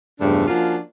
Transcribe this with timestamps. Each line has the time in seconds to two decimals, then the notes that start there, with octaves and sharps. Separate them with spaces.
0.21 E2 G2 C#3 F3 A3 D4
0.48 F3 A#3 C#4 D4 F4 F#4